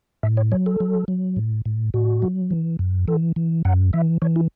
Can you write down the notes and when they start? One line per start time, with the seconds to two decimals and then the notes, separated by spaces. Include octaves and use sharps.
0.23 A2 E5
0.37 C#5
0.52 F#3 C#5
0.66 A4
0.80 F#3
1.08 F#3
1.36 A2
1.66 A2
1.94 A2 F#4
2.22 F#3
2.51 E3
2.79 F#2
3.08 E3 A4
3.36 E3
3.65 F#2 F#5
3.93 E3 E5
4.22 E3 C#5
4.36 E4